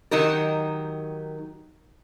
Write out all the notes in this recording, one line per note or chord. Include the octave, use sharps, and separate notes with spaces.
D#3 F#3 D#4 G4 A#4